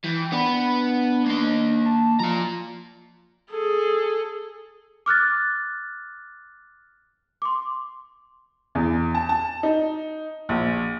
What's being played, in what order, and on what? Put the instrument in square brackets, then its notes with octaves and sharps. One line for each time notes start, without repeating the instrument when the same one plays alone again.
[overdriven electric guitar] E3 [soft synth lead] G5
[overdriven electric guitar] B3 B4 [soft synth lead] D4
[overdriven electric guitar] A#3 D#5
[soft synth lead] A5
[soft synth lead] F3 [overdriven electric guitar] F4 A#5
[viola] G#4 A4
[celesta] D6 F6 F#6 A6
C6 D6
[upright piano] E2
A5
A5
D#4
A#1